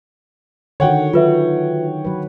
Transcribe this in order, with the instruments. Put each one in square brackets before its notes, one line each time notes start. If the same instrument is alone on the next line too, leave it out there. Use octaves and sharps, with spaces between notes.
[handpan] D3 D#3 F#4 [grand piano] C#5 F#5 G5
[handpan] F#3 [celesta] F4 B4 E5
[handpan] F#3 B4